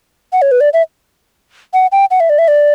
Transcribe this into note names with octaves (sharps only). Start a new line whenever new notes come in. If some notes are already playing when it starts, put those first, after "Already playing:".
F#5
C#5
B4
D5
E5
F#5
G5
F#5
E5
D5
E5
D5